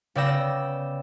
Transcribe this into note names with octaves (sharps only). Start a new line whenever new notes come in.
C#3 B3 D5 G5 E6 A#6